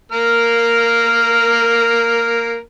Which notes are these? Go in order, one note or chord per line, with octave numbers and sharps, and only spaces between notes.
A#3 A#4 F6